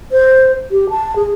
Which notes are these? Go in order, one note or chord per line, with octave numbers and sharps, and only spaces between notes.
C5
G4
A5
G#4